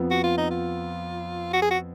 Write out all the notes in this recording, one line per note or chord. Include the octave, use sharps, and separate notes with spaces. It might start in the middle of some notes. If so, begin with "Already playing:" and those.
Already playing: F2 F3 B3
F#4
F4
D#4
F4
F#4
G#4
F#4